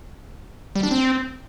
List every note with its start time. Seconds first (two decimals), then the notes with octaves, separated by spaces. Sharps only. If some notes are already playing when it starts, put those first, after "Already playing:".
0.75 G3
0.83 D4
0.91 C4